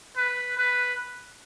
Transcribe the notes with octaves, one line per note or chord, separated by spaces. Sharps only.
B4
B4